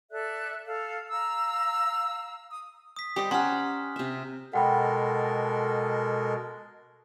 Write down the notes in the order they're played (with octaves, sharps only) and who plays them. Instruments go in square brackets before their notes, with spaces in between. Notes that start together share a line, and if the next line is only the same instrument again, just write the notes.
[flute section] A4 D5 E5 F#6
A4 F5
F5 A#5 E6
D#6
[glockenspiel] D#6 B6
[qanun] G3 [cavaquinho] G4 C5 D#5 [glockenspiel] D#6
[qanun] C#4 G4 [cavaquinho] C5 F#5 A#5 [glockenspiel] C6 F6
[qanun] C3 E5
[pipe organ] B2 G#3 [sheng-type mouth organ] A4 A#4 [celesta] F#5 G5 B5